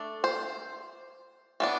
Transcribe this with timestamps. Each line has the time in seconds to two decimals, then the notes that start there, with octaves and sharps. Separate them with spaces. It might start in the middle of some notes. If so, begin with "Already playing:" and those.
Already playing: A3 D4
0.24 C5
1.60 E3 B3 D4